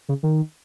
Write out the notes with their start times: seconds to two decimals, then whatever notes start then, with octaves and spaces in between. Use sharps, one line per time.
0.09 C#3
0.23 D#3